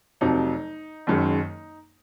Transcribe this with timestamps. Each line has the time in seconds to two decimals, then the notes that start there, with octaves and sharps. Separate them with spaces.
0.21 F1 F2 C3 F#3 D#4
1.07 F#1 F#2 D#3 G#3